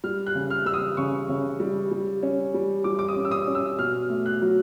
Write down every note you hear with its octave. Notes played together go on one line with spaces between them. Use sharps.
G3 F6
F#6
C#3
F6
G3 E6
D#6
C#3 C#6
C#3
G3
G3
C#4
G3
G3 D6
D6
D#6
C#4
E6
D#6
C#4
E6
B2 F6
A3
F#6
F#3